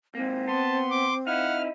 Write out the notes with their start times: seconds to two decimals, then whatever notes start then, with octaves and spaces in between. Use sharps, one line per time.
0.15 G#2 A#3 C4
0.48 B3 A5 C6
0.91 D6
1.27 D#4 E4 F5 F#5 F6